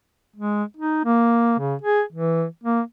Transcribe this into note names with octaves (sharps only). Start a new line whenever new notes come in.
G#3
D#4
A#3
C#3
G#4
E3
A#3